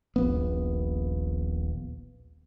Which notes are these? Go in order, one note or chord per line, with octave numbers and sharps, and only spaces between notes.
D#1 A#1 B3